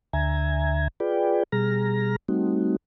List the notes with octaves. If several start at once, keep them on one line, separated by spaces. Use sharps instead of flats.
D2 D3 E5 G#5 A#5 G#6
F4 G#4 B4 D5 G5
B2 G3 G#4 A#5 F6 A#6
G3 A3 C4 D#4 F#4